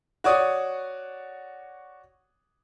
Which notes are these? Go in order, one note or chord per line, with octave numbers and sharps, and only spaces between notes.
F#4 C#5 D5 D#6